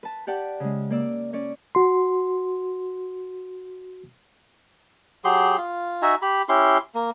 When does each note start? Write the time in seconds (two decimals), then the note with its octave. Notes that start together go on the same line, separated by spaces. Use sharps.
0.03 B4 A5
0.27 G4 D5 F#5 G5 A5
0.60 C#3 G#3
0.90 A#3 D5 E6
1.33 C#4 C#5 D5
1.75 F#4 C6
5.25 F#3 G4 G#4 C6
5.57 F4
6.02 D#4 F#4 E5 G#5
6.22 G4 B5
6.49 C#4 E4 G4 C6
6.95 A#3